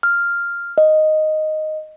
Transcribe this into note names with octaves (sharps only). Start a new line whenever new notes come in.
F6
D#5